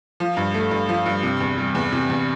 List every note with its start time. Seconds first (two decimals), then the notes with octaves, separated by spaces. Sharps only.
0.20 F3
0.37 G2
0.54 A3
0.71 G2
0.89 F3
1.06 G2
1.23 C3
1.40 E2
1.58 G3
1.75 E2
1.92 C3
2.10 E2